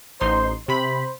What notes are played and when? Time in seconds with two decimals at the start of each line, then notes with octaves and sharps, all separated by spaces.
0.20 A1 D#4 C5 C6
0.68 C3 C5 B5